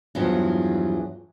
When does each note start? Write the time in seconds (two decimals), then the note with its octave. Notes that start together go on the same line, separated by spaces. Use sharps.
0.15 E2 G2 F3 F#3